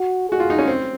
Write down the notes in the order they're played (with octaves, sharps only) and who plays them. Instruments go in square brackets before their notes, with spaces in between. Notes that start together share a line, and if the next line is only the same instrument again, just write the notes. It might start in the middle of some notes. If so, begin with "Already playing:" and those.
Already playing: [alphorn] F#4
[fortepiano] F#4 [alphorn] G#4
[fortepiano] F4
D#4
C#4
C4